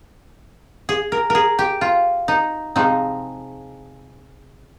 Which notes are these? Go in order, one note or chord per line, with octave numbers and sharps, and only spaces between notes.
G#4
A#4
G#4 A#4
G4
F4
D#4
C3 F3 G#3 C4 D#4